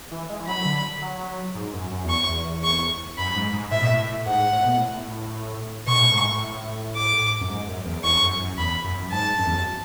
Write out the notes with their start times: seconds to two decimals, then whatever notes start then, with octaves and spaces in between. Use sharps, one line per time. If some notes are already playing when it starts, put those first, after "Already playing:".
0.11 E3
0.29 G#3
0.40 E3
0.47 F#3 B5
0.65 D3
1.02 F#3
1.55 G#2
1.73 F#2
1.91 F#2
2.04 E2
2.09 C#6
2.28 E2
2.63 C#6
3.18 F#2 B5
3.35 G#2
3.53 G#2
3.71 A2 E5
3.80 B2
3.90 A2
4.26 G#2 F#5
4.52 A2
4.64 B2
4.77 A2
5.87 B2 C#6
6.00 A2
6.14 G#2
6.27 A2
6.96 D6
7.41 F#2
7.49 G#2
7.68 F#2
7.85 E2
8.03 E2 C#6
8.22 F#2
8.40 F#2
8.57 E2 B5
8.84 F#2
9.11 G#2 A5
9.38 F#2
9.47 E2
9.56 F#2